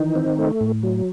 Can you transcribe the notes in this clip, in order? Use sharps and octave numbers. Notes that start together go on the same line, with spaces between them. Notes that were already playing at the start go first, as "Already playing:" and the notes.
Already playing: D#3 E3 D#4
C4
A3
A2
F#3